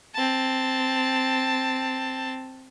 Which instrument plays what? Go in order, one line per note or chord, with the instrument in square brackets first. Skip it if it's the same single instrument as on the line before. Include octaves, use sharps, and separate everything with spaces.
[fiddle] C4 A5